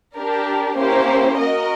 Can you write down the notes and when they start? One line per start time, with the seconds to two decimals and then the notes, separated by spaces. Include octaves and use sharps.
0.17 D4 G4 A#4
0.77 A#3 C#4 E4 G4 C5
1.38 F#4 A#4 D#5